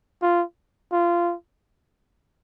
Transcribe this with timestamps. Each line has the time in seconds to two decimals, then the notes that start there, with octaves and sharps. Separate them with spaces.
0.22 F4
0.92 F4